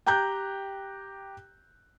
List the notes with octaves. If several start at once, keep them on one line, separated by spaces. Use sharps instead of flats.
G4 G5 A#5 F#6 G6